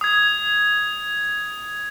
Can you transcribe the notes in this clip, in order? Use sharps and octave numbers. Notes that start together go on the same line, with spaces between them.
D#6 G#6